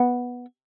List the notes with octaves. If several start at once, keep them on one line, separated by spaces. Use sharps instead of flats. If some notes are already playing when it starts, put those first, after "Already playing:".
Already playing: B3